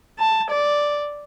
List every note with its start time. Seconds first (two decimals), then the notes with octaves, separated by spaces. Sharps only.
0.19 A5
0.51 D5